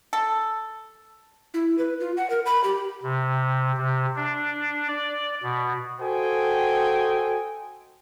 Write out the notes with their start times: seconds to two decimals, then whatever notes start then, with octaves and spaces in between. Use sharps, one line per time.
0.13 A4
1.54 E4
1.78 B4
2.00 F4
2.17 F#5
2.30 A#4
2.46 B5
2.64 G4
3.03 C3
3.77 C3
4.16 D4
4.88 D5
5.43 B2
6.01 F#4 A4 C5 D#5 G5 G#5